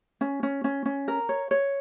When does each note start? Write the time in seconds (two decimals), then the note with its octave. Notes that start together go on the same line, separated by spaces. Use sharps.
0.21 C#4
0.43 C#4
0.64 C#4
0.86 C#4
1.08 A#4
1.29 C#5
1.51 C#5